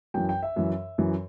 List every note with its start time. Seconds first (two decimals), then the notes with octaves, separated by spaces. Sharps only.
0.14 F#2 E3 G5
0.29 G5
0.43 E5
0.56 F#2 E3
0.98 F#2 E3